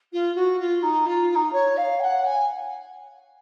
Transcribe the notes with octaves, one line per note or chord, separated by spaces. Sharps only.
F4
F#4
F4
D#4
F4
F4
D#4
C#5
F5
G#5
F#5
G#5